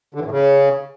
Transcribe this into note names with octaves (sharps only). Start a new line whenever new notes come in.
D3
E3
A2
C#3